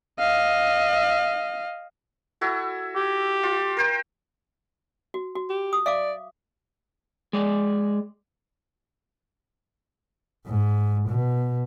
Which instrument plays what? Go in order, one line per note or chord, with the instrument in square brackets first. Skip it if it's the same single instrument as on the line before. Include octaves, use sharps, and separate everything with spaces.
[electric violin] D#5 F5
[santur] E4 F#4 A4
[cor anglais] G4
[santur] F4
A#4 C5 G5
[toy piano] F#4
F#4
[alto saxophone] G4
[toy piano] D#6
[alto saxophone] D5 [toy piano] E5 F5 D6
[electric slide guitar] G#3 D5
[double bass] G#2
B2